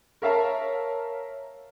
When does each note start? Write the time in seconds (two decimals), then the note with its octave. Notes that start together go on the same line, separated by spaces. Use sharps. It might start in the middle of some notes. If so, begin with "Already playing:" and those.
0.22 A#4 C#5 E5 F5 A5 A#5